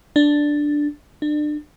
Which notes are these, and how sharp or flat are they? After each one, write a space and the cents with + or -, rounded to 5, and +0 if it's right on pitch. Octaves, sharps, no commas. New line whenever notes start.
D4 +0
D4 +30